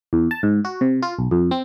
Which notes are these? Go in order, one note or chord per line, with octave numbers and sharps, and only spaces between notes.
E2
A5
G#2
F#4
C3
F4
B1
F2
C4